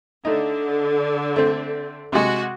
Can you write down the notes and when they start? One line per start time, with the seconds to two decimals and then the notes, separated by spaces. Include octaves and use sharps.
0.25 D3 A3 D#4
1.36 A3 C4
2.12 C3 G#3 F#4